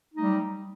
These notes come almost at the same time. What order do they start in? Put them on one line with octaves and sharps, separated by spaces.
D#4 A3 G3 F#3